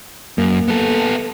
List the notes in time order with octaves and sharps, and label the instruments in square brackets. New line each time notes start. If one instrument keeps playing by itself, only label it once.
[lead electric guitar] F#2 [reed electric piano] A#3
[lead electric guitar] B3 A4